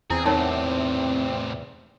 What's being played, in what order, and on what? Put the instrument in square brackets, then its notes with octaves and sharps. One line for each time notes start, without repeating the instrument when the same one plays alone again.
[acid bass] E2 [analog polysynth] C4 [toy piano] E4 [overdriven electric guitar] G#4
[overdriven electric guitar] A2 C3 [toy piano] D#4 A#4 C#5